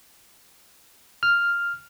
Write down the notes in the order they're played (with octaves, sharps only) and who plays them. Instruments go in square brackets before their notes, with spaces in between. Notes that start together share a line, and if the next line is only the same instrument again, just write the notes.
[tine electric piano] F6